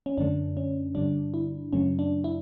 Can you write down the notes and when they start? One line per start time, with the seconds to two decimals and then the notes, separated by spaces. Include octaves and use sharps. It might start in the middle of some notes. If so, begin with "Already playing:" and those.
0.06 C#4
0.18 F#2 D3 A3 D4
0.57 C#4
0.95 G2 D3 G3 D4
1.34 E4
1.73 F#2 C#3 F#3 A3 C#4
1.99 D4
2.24 E4